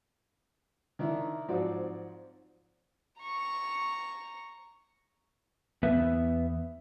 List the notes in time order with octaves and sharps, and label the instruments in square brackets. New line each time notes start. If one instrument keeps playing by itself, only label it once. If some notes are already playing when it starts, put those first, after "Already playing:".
[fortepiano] D#3 D4 E4
G#2 F3 F#3 C4 F#4 D5
[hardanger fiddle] A#5 C#6
[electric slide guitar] E2 B3 B4 E5